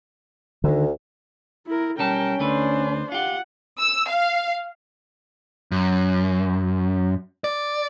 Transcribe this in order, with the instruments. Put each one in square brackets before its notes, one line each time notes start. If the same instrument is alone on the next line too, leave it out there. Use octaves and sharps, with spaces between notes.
[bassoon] D2 [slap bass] D3 D#3
[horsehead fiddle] E4 A#4
[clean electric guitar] B1 G3 A5 [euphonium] C#4 [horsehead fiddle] A#4 G5
[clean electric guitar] D2 A3 B4 [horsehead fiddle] D4 C5
[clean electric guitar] F4 G4 [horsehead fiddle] F#5
[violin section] E6
F5
[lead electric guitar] F#2
D5